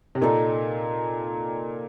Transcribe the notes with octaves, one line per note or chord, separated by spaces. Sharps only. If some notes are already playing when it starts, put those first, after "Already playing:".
C3
A#2 D#4 A4 D5